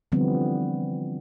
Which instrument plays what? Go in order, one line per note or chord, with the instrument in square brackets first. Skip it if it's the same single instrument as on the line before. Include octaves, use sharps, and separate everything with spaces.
[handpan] D3 E3 F3 G3 B3 C4